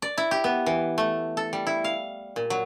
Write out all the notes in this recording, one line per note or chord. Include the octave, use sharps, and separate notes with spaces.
D5
E4
G4
B3
E3
A3
A4
G3
E4
F5
A#2
F#3